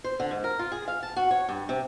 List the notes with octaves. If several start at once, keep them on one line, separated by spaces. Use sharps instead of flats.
C5
D3
G#2
A#4
F4
G#4
F5
A5
F#4
C#5
G2
C3